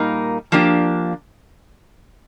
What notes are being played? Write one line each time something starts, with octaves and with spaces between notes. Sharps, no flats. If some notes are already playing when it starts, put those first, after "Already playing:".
Already playing: A#2 G3 A#3 D#4 A#4
F3 A#3 D4 G4